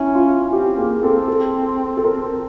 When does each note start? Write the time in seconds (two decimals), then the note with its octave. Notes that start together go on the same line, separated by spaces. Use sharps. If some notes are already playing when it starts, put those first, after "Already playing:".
Already playing: C#4 E4
0.15 F4
0.52 C4 G4
0.77 A#3 G#4
1.03 C4 A4
1.28 A4
1.97 A4
2.04 A#4